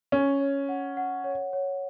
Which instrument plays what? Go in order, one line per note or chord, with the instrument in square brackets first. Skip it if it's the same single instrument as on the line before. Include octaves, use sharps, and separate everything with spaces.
[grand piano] C#4 [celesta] C#5
[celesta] C#5
F#5
F#5
C#5
C#5